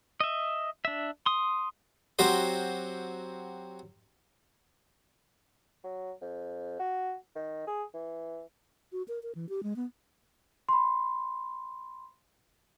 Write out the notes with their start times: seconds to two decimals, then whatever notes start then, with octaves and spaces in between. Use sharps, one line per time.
0.20 D#5 E5
0.85 D4 E5
1.26 C6 D#6
2.19 F#3 C4 F#4 G4 C5 C6
5.84 F#3
6.21 F2
6.79 F#4
7.35 D#3
7.67 G#4
7.94 E3
8.92 F#4
9.08 A#4
9.23 A#4
9.35 E3
9.49 G4
9.63 G#3
9.76 B3
10.69 B5 C6